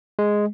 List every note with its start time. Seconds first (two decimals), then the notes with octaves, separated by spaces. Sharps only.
0.19 G#3